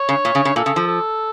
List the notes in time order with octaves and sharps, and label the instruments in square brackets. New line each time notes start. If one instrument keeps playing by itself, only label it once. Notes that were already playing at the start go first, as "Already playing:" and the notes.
Already playing: [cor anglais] C#5
[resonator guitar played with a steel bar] C#3
A#2
C#3
C#3
[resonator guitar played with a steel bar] A#2 [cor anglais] A4
[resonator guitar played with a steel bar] C#3
F3
[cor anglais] A4